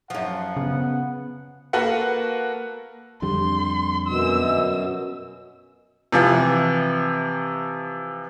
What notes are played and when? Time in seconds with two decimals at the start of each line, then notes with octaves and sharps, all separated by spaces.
0.10 F#2 F3 F#5
0.56 C#3 B3
1.73 A#3 F#4 A4 B4 F#5
3.22 F2 D3 G3 C6
4.08 F#2 B2 E6
6.12 C3 E3 F3